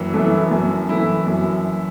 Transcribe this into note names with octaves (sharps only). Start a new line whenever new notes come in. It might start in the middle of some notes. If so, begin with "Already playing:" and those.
Already playing: F#1 F#2 E3
F#2 E3 A3
F#2
E3 A3 E4
F#2